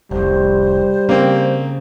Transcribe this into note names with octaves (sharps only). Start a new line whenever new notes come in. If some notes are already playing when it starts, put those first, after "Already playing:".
F1 C2 G3 C5
C#3 A#3 C4